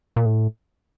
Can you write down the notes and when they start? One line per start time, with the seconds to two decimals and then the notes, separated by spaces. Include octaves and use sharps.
0.16 A#2
0.26 A2